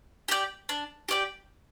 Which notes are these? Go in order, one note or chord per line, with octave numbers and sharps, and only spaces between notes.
G4 D5 G5
D4
G4 D5 G5